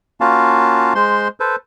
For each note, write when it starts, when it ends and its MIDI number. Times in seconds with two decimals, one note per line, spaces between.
0.21 0.93 58
0.21 0.93 61
0.21 0.93 65
0.21 0.93 66
0.21 0.93 77
0.21 0.93 81
0.95 1.28 56
0.95 1.28 72
0.95 1.28 84
1.40 1.56 69
1.40 1.56 71
1.40 1.56 72